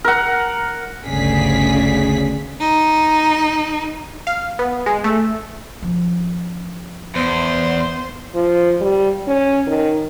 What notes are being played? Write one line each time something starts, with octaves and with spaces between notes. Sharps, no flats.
A#4 F#5
G1 D2 C#3 G#4 D5 B6
D#4
F5
B3
G#3
A3
F3 C#4
E2 B3 C5
F3
G3
C#4
D#3